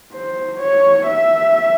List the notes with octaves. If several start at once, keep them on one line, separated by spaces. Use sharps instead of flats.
C5
C#5
E5